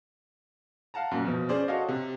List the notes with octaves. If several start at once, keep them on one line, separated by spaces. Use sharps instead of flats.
F5 F#5 A5 A#5
F#2 A#2
B2 F3
C#4 G#4 C5 D5
F#4 A4 C#5 D#5 F5
C3